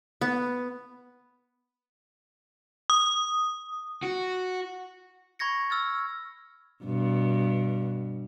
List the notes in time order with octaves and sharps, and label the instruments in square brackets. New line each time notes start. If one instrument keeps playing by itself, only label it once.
[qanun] B3
[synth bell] D#6
[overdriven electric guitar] F#4
[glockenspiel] B5 C#6 G#6 A#6 C#7
E6 F6 A6
[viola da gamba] G2 B2